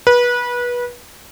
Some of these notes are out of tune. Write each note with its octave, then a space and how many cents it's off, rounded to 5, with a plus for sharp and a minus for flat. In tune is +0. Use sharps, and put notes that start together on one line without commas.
B4 -25